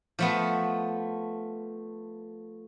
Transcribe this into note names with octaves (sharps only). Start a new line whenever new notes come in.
F3 A3 B3